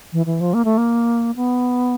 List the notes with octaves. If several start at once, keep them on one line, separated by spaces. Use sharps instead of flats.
E3
E3
F3
A#3
A3
A#3
B3